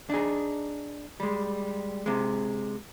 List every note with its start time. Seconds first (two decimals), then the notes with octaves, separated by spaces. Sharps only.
0.10 D4 D#4 G#4
1.20 G3 G#3
2.06 C3 G#3